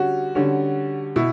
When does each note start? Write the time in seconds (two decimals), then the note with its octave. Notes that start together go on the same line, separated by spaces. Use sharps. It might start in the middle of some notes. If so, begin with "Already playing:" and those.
Already playing: D3 G3 C#4 F#4
0.35 D3 G3 C#4
1.16 B2 E4